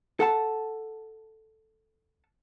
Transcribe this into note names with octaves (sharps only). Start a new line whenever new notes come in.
A4 F#5 A5